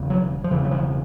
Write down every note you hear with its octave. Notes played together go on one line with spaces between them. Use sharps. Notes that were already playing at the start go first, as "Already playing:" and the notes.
Already playing: E1 E2 C#3
F#3
F3
E1 E2 C#3 E3
F#3
F3